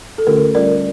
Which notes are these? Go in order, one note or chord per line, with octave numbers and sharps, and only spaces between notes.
A4
D3 A3 C#4 F4 G4 A#4
G3 C#4 F4 A#4 D5